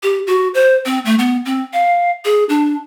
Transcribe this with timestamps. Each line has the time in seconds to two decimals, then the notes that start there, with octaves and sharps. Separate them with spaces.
0.03 G4
0.27 F#4
0.54 C5
0.86 C4
1.05 A3
1.19 B3
1.45 C4
1.73 F5
2.25 G#4
2.49 D4